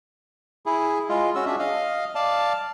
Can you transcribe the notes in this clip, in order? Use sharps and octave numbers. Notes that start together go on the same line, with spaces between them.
E4 G#4
G#3 F4
C#4 F#4 E6
D4 G#4 E5
D#5 F5
D5 F5 A5